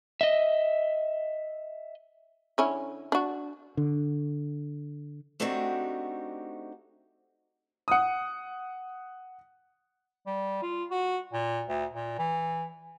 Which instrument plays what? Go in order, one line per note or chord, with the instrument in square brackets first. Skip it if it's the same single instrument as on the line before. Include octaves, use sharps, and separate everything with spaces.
[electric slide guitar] D#5 E5
[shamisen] D3 C#4 E4
D4 F#4
[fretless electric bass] D3
[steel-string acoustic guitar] A3 C4 D4 D#4 F#4 G4
[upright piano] F#5 D#6
[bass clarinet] G3
F4
F#4
A#2
D2
A#2
E3